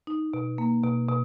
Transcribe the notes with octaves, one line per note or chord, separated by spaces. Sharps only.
D#4
B2
A#3
B2
B2